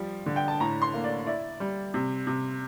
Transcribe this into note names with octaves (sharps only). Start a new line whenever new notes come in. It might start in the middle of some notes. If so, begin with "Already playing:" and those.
Already playing: F3 G3
D3
G5
A5
A2 A#5
C6
A#3
D5
E4 D5
G3
C3
C3